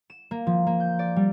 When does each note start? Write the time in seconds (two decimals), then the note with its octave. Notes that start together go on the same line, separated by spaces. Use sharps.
0.10 E7
0.31 A#3
0.47 F3
0.67 A#3
0.80 G6
0.99 D5
1.16 G3